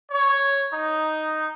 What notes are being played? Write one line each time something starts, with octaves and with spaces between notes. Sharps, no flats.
C#5
D#4